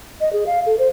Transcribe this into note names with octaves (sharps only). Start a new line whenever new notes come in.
D#5
G#4
F5
A4
C5